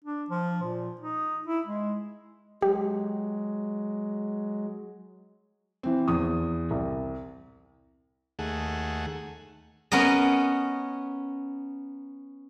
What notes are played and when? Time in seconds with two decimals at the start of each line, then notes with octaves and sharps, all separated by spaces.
0.04 D4
0.30 F3
0.63 A#2
1.01 D#4
1.47 E4
1.66 G#3
2.62 F#3 G#3 G4
5.83 E3 C4
6.08 E2 D#6
6.70 C2
8.39 D#2 A3 G#4 F#5
9.92 B3 C#4 A#4 D#5